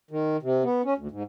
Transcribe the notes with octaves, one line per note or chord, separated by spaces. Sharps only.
D#3
C3
B3
C#4
D2
G#2